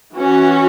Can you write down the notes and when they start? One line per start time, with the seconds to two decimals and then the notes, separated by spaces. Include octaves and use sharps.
0.15 E3 C#4 F#4